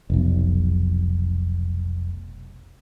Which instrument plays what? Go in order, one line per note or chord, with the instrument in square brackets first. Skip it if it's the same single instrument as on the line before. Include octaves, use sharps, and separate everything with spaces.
[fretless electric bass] F1 B1